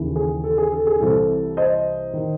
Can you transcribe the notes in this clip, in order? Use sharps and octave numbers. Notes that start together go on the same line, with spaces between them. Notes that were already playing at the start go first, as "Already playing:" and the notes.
Already playing: D#2 C#3 E3
G#4
A4
G#4
A4
G#4
C2 C3 E3 A4
C5 D#5
D#3